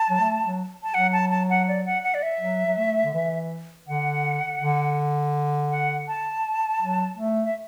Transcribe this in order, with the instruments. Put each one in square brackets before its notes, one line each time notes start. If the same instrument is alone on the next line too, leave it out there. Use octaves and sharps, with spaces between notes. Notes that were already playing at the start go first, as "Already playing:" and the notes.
Already playing: [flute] A5
[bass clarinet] F#3
A3
F#3
[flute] A5
[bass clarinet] F#3 [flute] F#5
[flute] A5
A5
F#5
D5
F#5
F#5
D5
E5
[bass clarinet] F#3
F#3
A3
D3
E3
[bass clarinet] D3 [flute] F#5
[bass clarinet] D3
[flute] F#5
A5
[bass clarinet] F#3
A3
[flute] E5